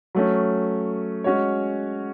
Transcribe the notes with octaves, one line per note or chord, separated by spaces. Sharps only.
F#3 A3 C#4
G#3 C#4 F#4 C#5